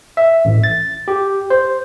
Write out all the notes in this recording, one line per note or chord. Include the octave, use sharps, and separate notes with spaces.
E5
A1
A6
G4
C5